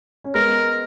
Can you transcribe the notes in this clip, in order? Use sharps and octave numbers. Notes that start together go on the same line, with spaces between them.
C#4
G#3 B3 A#4